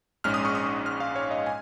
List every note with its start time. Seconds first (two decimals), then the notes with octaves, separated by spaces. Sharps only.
0.24 A#1 G#2 G#3 C#4 F6
0.34 D#6
0.45 C#6
0.55 D#6
0.86 F6
1.00 F5
1.16 C#5
1.31 D#5
1.46 G#5